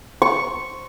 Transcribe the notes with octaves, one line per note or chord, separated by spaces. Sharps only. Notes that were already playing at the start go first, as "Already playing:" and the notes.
C#6